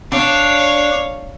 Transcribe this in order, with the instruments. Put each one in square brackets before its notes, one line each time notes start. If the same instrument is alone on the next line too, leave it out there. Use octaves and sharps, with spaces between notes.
[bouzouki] D4 [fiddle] C#5 F5